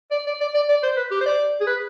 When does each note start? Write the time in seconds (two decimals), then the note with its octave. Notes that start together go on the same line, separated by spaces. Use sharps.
0.11 D5
0.26 D5
0.40 D5
0.54 D5
0.69 D5
0.83 C5
0.97 B4
1.11 G4
1.20 C5
1.26 D5
1.61 G#4
1.67 B4